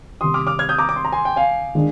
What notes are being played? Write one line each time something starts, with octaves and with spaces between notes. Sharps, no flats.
C3 D#3 G3 C6 D#6
D6 F6
D6 F6
F6 G#6
D#6 G6
A#5 D6
D6
C6
A#5
G#5 C6
G5
F5 G#5
D#3 G#3 D4